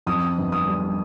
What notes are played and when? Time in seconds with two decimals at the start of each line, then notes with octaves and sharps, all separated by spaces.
0.06 F2 D#6
0.38 G1
0.52 D#6
0.67 G3